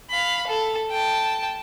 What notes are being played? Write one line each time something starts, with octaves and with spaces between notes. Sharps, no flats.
F5 B5
A4
G5 A5